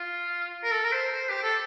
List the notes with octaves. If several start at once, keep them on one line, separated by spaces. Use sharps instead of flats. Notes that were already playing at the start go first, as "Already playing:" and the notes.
Already playing: F4
A#4
A4
A#4
C5
C5
G4
A4